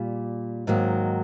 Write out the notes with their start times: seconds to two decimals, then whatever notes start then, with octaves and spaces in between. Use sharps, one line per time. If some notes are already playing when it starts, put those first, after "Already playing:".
Already playing: A#2 G3
0.67 G#2 D#3 F#3 A#3